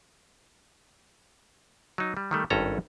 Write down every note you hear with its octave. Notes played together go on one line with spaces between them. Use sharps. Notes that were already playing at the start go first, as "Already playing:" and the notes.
F#3 D#4
G3
D#3 G3 A3
G#1 G2 C#4 A4 A#5